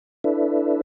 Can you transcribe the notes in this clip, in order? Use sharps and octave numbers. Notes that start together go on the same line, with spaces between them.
D4 E4 A4 B4 D5 E5